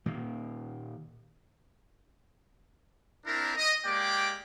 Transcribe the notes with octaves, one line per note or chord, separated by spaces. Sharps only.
A#2 D#3 A#3
C4 D4 E4 A#4
D#5
G#3 A#3 G4 D5 G5 D6